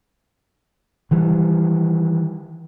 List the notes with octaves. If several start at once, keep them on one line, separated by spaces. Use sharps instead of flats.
D#3 E3 G3